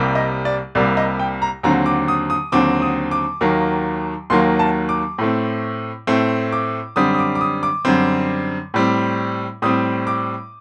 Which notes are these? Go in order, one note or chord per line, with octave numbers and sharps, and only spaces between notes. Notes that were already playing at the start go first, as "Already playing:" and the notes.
Already playing: C2 C3 G3 A#3
D#5
D5
C2 C3 G3 A#3 D5
D#5
G5
A#5
D#2 D3 F#3 C4 A#5
D6
D#6
D#6
D#2 D3 F#3 C4 D6
D#6
D6
D#2 D#3 F#3 A#3
D#2 D#3 F#3 A#3 C6
A5
D6
A2 A3 C4
A2 A3 C4 C6
D6
F#2 D3 G3 C4 D#6
D#6
D6
D6
D#6
D6
F#2 D3 G3 C4
A2 G3 C4
A2 G3 C4 D#6
D6